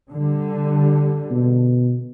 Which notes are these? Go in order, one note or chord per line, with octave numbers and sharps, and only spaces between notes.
D3 G3
B2